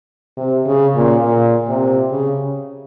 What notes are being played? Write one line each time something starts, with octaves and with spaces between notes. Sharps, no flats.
C3
C#3
A#2
A#2
C3
C#3